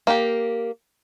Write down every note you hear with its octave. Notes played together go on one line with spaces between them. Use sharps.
A#3 G4